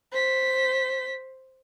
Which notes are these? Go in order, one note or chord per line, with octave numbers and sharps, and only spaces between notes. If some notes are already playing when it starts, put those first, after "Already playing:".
C5 B6